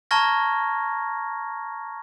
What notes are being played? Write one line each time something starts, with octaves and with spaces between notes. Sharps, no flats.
A5 A#5 C#6 F6 G#6 A#6